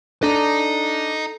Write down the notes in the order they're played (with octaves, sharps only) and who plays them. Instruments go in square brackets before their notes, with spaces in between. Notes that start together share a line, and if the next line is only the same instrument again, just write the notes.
[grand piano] D4 [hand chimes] A4 [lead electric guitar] D#5 A#5